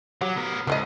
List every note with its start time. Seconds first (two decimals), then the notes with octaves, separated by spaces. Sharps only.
0.21 F#3 G4 C#5 F#5
0.36 B3 A#4
0.67 C#2 E3 F3 D#5